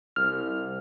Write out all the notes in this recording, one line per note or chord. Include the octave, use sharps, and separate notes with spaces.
C2 F6